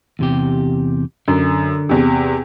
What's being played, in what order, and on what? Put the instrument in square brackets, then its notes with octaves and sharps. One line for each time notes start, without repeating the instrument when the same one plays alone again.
[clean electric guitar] E2 C3 G4
[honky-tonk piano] F#2 [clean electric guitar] D3
[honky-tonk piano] E2 C3